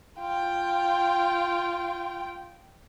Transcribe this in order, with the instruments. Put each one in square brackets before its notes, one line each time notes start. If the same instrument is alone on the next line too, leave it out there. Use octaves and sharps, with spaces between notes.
[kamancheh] F4 G5